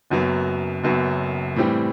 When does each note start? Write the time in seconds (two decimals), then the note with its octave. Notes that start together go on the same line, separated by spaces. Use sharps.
0.10 F#1 F#2 F#3 B3
0.83 F#1 F#2 F#3 B3
1.56 A2 E3 G3 C4 G4